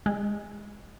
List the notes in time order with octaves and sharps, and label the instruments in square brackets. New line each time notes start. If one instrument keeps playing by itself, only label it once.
[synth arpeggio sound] G#3